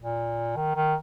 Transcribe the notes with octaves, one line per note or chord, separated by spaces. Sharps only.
A#2
D#3
D#3